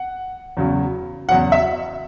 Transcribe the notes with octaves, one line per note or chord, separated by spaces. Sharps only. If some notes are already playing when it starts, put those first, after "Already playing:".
Already playing: F#5
E2 C#3 F#3
E2 C#3 F#3 F#5
E5